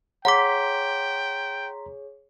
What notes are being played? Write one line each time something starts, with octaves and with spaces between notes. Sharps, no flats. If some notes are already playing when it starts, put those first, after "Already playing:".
G#4 C#5 F#5 G5 A#5 C6 D6 B6